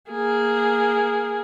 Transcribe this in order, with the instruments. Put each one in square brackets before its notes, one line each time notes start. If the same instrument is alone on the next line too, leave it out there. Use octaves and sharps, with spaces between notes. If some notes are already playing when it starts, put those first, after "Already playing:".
[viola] A#3 G#4